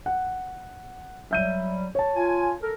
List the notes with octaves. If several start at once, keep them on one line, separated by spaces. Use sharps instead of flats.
F#5
F#3 G3 E5 G6 D#7
C#5 A5
F4 G#5
A4 A#4